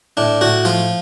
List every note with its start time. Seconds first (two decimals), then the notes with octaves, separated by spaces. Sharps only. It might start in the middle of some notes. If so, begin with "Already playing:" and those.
0.17 A2 D4
0.41 A2 F#4
0.65 F3 F4